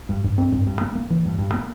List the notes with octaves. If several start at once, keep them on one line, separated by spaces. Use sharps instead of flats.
G2
G2
C4
G2
G2
A#3
A#3
E3
G2
G2
A#3